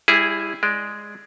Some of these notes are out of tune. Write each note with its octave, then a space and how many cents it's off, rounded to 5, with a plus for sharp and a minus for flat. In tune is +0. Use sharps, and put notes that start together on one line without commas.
G3 +30 E4 +0 G#4 +0
G#3 +0 D5 +0